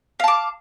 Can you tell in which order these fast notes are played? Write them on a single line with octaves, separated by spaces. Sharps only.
F5 A5 D6